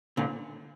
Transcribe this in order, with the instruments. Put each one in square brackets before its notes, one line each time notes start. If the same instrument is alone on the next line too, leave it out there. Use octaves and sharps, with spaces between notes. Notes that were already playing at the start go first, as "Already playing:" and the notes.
[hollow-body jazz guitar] A#2 D3